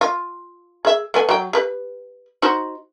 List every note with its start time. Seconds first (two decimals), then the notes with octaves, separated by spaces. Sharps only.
0.01 F4
0.85 G#4 E5
1.14 A3 B3 G#5
1.29 F#3 G5
1.53 G4 B4
2.42 D#4 F#4 C5